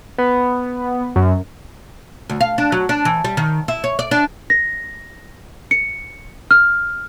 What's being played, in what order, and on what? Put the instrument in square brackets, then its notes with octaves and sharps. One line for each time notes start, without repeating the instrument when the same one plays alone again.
[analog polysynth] B3
F#2
[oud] D2
F5
D4
F#3
D4
E3
G3
D#3
E4
C#5
D5
D4
[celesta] A#6
C#7
F6